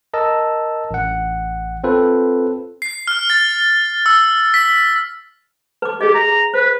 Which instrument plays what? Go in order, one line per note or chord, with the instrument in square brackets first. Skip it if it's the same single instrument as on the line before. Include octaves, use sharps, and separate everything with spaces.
[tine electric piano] A#4 D#5 A5 E6
A1 F#5
C4 F4 A4 B4 C5
[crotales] C7
F6
A6
E6
B6
[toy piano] B4 D6
[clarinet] G4 [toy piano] G#4 D#5
[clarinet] A#5
[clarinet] B4 [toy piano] C5